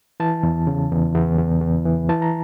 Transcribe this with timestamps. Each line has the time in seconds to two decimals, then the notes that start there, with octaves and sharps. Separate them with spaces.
0.20 E3 A5
0.43 E2
0.67 C#3
0.91 E2
1.14 E2
1.38 E2
1.62 E2
1.85 E3
2.09 E3 A5
2.22 A#5